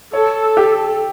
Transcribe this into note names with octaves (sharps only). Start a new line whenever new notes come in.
A4 C#5
G4